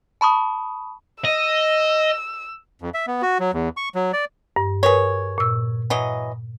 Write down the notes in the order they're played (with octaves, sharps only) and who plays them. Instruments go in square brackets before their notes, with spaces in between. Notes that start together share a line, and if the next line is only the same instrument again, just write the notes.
[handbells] A5 B5 C#6 D#6
[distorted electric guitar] D#5 [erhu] E6
[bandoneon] F2
E5
B3
F#4
F#3
E2
C#6
F#3
D5
[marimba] G2
[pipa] G#4 C#5 [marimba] A#4 B4
[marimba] A#2 E6
[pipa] E3 F#3 D#5